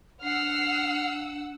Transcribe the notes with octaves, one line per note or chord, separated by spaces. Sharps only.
D4 F#5 E6 F6 C7